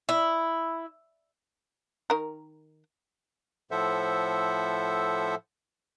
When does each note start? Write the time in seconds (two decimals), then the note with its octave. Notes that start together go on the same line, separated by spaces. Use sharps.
0.09 E4
2.10 D#3 A#4
3.71 A2 F3 A4 C5 E5 F#5